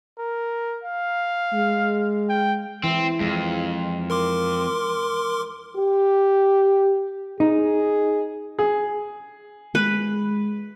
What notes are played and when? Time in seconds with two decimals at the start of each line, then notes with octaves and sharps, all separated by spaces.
0.18 A#4
0.84 F5
1.53 G#3
2.29 G5
2.84 E3 C4 E4
3.20 F2 G#3
4.10 A#4 C6 D6
5.77 G4
7.40 D#4 G#4
8.59 G#4
9.75 G#3 B4